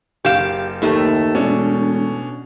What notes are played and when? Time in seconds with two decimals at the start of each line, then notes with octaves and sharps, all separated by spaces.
0.25 F#1 G4 F5 E7
0.82 D#2 A2 A3
1.35 E1 B2 C#4 D4